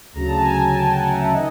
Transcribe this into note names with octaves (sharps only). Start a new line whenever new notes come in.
D2 C#3 F#3 A#5
A5
G#5 A#5
G5 A5
F#5 G#5
E5 F#5
D#3 D#5